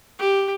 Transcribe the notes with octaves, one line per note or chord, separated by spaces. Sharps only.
G4